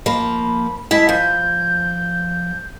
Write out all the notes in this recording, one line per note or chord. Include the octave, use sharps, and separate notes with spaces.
F3 A#3 B5
G#3 E4 A5 B6
F3 G6